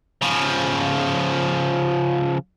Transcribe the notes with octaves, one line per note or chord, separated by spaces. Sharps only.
C#3 F3